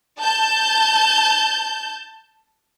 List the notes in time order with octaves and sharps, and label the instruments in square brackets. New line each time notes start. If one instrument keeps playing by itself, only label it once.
[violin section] A5 G6